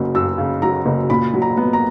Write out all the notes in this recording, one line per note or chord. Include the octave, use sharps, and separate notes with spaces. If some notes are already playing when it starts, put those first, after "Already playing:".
Already playing: F#1 F#2 C#3 F#3
F#2 E6
C#3
F#3 A#5
F#1
A#2 B5
F#3
A#5
B3
A#5